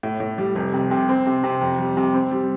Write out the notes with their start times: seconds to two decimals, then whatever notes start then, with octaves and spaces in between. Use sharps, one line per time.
0.03 A2
0.20 A2
0.38 G3
0.55 F1
0.74 C3
0.91 C3
1.09 C4
1.26 C3
1.44 C3
1.61 F2
1.79 G3
1.97 C3
2.14 C4
2.31 G3